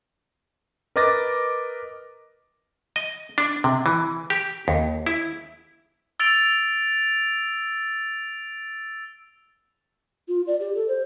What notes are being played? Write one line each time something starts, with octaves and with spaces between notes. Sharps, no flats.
A#4 B4 D#5 D6 A6 A#6
D#5
D4
C3
E3
G4
D#2
E4
E6 A6 D7 F7
F4
D5
G4
A4
C5